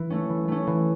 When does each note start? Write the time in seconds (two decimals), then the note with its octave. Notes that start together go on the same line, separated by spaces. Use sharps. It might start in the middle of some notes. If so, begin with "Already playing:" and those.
Already playing: E3
0.10 A3 C#4
0.29 E3
0.48 A3 C#4
0.67 E3